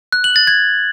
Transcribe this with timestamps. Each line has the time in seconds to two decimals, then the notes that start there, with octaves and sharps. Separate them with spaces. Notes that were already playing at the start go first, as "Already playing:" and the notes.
0.12 F#6
0.24 F#7
0.36 A6
0.47 G#6